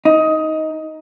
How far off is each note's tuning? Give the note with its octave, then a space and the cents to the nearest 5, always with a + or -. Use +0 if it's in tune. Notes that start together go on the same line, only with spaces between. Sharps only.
D#4 +15